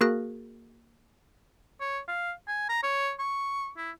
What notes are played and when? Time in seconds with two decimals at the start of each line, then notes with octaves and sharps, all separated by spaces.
0.01 A#3 F#4 G#4 A#4 F#6 A#6
1.81 C#5
2.08 F5
2.48 G#5
2.69 A#5
2.83 C#5
3.19 C#6
3.77 E4